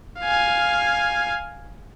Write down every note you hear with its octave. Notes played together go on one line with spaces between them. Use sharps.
F5 G#5